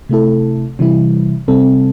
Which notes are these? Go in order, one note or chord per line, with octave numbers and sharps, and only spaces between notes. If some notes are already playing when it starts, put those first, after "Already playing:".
C3 A3 E4 A4
C3 E3 G3 E4
C3 G3 C4 A4